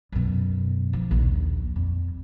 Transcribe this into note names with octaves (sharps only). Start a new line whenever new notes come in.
F#2 B2
F3
A#1 D#2
F2